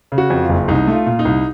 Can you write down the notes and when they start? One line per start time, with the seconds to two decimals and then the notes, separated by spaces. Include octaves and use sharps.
0.12 C#3
0.18 F#4
0.30 F2
0.43 F4
0.49 F#1
0.68 C2 D#4
0.87 A3
0.93 F4
1.06 A#2
1.19 D#4
1.25 C2